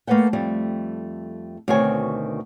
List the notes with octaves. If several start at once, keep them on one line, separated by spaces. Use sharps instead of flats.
A3 A#3 A4 B4 F#5 G5
F2 G3 A3
D2 B2 D#3 C4 C#5 G#5